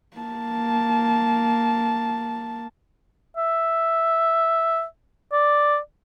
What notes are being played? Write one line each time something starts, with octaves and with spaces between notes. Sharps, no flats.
A#3 A5
E5
D5